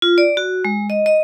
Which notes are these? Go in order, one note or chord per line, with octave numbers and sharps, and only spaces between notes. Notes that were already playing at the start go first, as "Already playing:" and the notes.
F4
D5
F#4
G#3
D#5
D#5